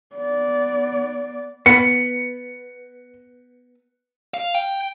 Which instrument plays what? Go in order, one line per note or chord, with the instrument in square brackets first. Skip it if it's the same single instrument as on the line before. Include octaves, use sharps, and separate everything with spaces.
[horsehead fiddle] B3 D5
[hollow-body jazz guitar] B3 [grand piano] C#7
[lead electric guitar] F5
G5